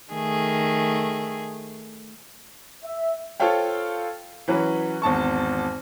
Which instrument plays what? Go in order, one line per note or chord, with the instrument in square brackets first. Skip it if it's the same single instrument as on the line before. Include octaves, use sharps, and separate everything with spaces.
[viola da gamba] D#3 A3 G#4
[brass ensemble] E5
[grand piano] F4 A4 C5 C#5 F5 G5
E3 F#3 C#4 B4
G#1 E2 A5 C#6